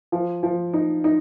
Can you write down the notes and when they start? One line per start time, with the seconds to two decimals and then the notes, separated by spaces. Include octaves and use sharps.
0.12 F3
0.43 F3
0.73 D#4
1.04 D#4